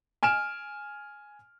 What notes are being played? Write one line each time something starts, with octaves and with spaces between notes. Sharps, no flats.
G#5 F6 D7 E7